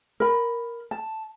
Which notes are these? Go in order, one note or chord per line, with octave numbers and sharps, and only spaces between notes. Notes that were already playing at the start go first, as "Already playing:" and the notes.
A#4 B5
A5